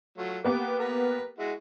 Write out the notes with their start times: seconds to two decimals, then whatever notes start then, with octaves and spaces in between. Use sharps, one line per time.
0.18 F#3 A3 F4
0.45 A#3 B3 G4 G5 D6
0.79 A#4 B4
1.39 G#3 E4 F#4